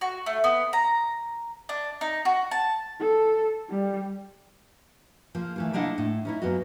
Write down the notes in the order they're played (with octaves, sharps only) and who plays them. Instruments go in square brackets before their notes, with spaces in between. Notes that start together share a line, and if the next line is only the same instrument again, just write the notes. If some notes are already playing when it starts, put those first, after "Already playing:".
[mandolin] F#4
A3
B3
A#5
D4
D#4
F#4
A5
[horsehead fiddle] A4
G3
[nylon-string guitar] F3 A#3
E3 A3 A#3
C3 A#3 D4 E4 D#5 F#5
A2
C#4 D#4 E4
F#2 A#3 B3 F#4 D#5